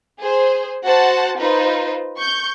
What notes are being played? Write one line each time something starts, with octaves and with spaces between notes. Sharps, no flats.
G#4 C5
F#4 C5 F#5 A5
D#4 F4 B4 C5
C#6 G6